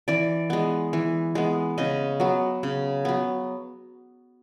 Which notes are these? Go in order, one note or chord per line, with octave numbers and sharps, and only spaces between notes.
E3 D5
G#3 B3
E3
G#3 B3
C#3 D#5
F#3 B3
C#3
F#3 B3